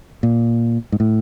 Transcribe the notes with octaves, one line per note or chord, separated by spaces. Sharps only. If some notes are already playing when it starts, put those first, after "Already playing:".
A#2
G#2
A2